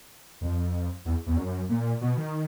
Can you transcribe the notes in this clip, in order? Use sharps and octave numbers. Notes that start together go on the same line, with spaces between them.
F2
E2
E2
F#2
A#2
B2
D#3